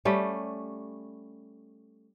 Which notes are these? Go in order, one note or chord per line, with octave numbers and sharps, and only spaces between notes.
G3 A3 C#4